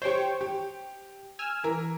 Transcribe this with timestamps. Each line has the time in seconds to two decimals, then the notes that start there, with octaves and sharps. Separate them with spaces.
0.02 G4 C5 C#5 G5 C#6
0.41 G4
1.39 G#5 E6 F6
1.63 E3 A#4